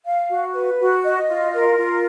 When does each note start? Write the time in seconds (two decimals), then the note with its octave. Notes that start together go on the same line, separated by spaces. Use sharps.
0.05 F5
0.30 F#4
0.54 B4
0.79 F#4
1.04 D#5
1.28 F4
1.53 A#4
1.78 F4